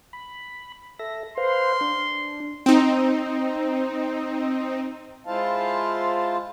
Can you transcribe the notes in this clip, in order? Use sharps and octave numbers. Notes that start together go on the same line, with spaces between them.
B5
A4 E5 A#6
B4 C5 F5 C6
D4
C4 D#4
G#3 E4 F4 C5 F5 A5